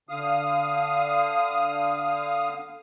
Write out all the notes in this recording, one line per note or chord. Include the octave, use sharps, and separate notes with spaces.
D3 F5 D#6